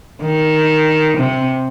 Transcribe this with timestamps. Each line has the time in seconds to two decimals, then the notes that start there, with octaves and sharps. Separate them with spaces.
0.22 D#3
1.17 C3